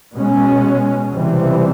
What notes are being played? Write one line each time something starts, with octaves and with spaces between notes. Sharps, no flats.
B2 G#3 C#4
C#2 C3 E3 G3 C4